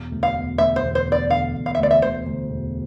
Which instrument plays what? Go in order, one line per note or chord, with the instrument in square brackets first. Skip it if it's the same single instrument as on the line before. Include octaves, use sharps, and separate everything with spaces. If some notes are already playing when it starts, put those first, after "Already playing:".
Already playing: [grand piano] E1
D2
[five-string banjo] F5
[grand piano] E1
[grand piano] D2 [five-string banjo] E5
[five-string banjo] C5
[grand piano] E1
[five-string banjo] C5
[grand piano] E1
[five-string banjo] D5
[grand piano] D3 [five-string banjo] F5
[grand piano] E1
[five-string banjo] F5
E5
[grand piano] D2 [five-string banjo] D5
[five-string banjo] E5
[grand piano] D2 [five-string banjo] C5
[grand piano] D2
E1